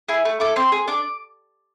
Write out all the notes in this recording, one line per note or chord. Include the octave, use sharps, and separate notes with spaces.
E4 G#4
A3
E4 A4 D6
C4 C6
G#4
D4 D6